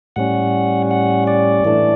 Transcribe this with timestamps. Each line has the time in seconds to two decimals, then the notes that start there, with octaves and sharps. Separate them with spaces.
0.16 A2 G3 C#4 F#5
0.91 F#5
1.27 D5
1.65 A2 E3 A3 D4